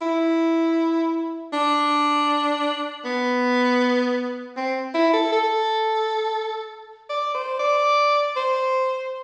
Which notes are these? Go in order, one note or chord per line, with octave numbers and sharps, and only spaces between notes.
E4
D4
B3
C4
E4
A4
A4
D5
C5
D5
C5